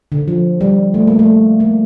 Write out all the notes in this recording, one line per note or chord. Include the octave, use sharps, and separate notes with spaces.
D3
F3
G3
A3
A#3
A3
A#3